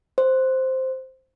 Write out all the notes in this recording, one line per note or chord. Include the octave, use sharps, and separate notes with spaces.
C5